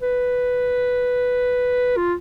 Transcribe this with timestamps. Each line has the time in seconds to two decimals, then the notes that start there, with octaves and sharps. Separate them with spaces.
0.02 B4
1.97 F4